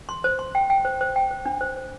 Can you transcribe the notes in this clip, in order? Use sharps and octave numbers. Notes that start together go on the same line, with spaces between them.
C6
C5
C6
G5
G5
C5
C5
G5
C5
D4
C5
C5